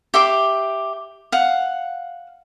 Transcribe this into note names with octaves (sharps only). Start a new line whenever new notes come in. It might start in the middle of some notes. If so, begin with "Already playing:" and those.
G4 E5 C6 D6
F5 F#5